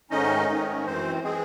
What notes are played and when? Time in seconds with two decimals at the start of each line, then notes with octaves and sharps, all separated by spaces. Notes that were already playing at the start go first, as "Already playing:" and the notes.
0.11 G#2 D#3 A3 C#4 D#4 D#5
0.48 G#2 D#3 A3 C#4
0.86 F#2 E3 C4 C5
1.23 E3 G#3 C4 G#4